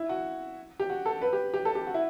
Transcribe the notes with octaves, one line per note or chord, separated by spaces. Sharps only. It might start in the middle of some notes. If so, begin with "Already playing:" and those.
Already playing: E4
F#4
G4
F#4
A4
B4
G4
G4
A4
G4
F#4
E4